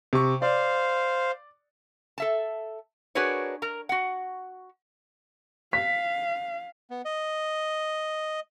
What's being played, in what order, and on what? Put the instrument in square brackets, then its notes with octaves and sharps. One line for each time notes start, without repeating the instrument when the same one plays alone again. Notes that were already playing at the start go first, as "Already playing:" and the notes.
[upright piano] C3 C#6
[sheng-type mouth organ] C5 F5 [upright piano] D5
[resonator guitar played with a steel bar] A4 E5 A5
D4 F#4 G#4 A#4 B4 C#5
A#4 A#5
F#4 F#5
[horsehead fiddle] F5 [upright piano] B6
[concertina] B3
D#5